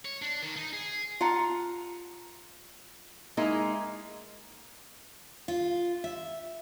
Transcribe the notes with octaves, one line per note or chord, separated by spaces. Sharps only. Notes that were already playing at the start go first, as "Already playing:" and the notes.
C#5
D4
D#3
D#4
G#4
F4 F#5 A#5
G#3 A#3 D#4 E4
F4
E5